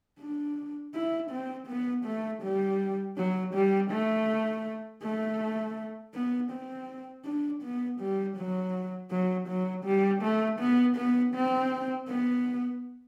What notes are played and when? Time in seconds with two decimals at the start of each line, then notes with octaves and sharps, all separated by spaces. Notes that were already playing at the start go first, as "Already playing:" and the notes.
0.19 D4
0.94 E4
1.31 C4
1.68 B3
2.05 A3
2.42 G3
3.17 F#3
3.54 G3
3.91 A3
5.03 A3
6.14 B3
6.51 C4
7.25 D4
7.63 B3
8.00 G3
8.37 F#3
9.11 F#3
9.48 F#3
9.85 G3
10.22 A3
10.60 B3
10.96 B3
11.34 C4
12.08 B3